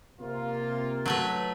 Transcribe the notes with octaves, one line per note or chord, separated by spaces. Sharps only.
C3 A#3 F4
F#3 A3 B4